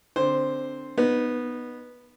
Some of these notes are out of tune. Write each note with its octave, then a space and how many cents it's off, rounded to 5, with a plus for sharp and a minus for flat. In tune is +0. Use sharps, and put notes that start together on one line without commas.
D3 +0 C4 +0 C5 +0
B3 -10 D#4 -25